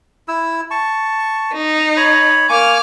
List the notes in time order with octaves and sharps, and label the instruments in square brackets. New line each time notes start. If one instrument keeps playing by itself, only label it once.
[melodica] E4 E6
A5 C#6
[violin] D#4
[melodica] C#5 B5
[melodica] A#3 G#5 C#6 [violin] D6 F6